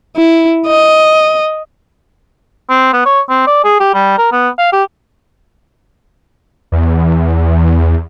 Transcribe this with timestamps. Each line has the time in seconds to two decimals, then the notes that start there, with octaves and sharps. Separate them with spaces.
0.17 E4
0.67 D#5
2.70 C4
2.93 B3
3.06 C#5
3.30 C4
3.47 D5
3.65 G#4
3.80 G4
3.94 G3
4.18 A#4
4.32 B3
4.59 F5
4.73 G4
6.72 E2